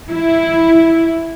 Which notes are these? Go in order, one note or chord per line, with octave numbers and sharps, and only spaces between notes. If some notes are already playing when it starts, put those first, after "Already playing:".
E4